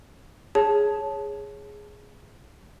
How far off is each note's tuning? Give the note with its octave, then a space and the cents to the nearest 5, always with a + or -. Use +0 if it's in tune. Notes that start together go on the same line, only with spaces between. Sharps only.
G#4 +0 C#5 +0 A5 -10